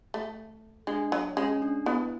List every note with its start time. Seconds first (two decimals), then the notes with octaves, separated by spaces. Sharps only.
0.14 A3
0.87 G#3 D4
1.12 F#3
1.37 G#3 C#4
1.62 D4
1.86 B3 E4